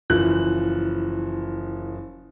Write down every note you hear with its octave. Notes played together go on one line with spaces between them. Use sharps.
F#1 E3 F3 F#6